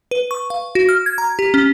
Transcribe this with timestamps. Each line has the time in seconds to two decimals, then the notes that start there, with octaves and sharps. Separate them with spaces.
0.11 B4
0.31 C#6
0.50 F5
0.75 F#4
0.89 F6
1.06 G#6
1.18 A#5
1.39 G4
1.54 C#4